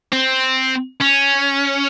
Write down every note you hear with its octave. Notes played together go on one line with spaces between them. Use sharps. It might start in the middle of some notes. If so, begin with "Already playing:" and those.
C4
C#4